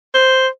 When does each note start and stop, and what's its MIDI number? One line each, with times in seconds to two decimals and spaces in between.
0.14 0.48 72